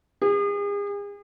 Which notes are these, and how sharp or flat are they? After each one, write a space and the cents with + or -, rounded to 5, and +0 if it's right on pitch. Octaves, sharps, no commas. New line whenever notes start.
G#4 -40